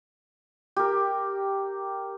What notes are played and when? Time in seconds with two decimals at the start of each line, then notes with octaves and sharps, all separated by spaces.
0.76 G4 A#4